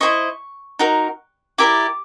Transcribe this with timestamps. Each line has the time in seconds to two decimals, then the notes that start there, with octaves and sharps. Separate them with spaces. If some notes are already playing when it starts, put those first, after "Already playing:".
0.01 E4 G#4 C5 D#5 C#6
0.79 D#4 F#4 A#4
1.58 E4 G4 A#4 D5 D6